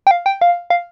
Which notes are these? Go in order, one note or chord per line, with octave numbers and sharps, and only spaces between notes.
G5
F5
G5
F5
F5